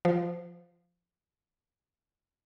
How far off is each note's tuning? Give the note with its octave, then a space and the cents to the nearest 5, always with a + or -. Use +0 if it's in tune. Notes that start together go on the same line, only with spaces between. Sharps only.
F3 +0 C5 -20